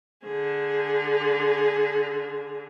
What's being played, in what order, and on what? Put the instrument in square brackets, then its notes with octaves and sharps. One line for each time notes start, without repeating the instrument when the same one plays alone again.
[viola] D3 G#4